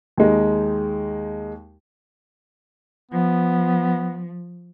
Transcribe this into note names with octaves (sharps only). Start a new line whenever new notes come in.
D#2 G#3 D#4
F3 B3